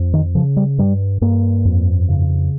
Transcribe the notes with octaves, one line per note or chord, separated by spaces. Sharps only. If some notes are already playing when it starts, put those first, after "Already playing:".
Already playing: F2
D#3
C#3 F3
G3
G2 G3
G2 A#3
F2
C#3